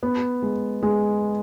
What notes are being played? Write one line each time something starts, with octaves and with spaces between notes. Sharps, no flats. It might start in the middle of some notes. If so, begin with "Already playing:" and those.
B3
G#3
G#3